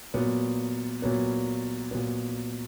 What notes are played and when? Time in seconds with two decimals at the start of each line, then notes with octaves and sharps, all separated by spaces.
0.14 A#2 F#3 B3
1.02 A#2 F#3 B3
1.91 A#2 F#3 B3